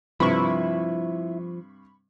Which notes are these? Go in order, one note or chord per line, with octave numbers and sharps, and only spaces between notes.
G2 C3 F3 E4 B5 C#6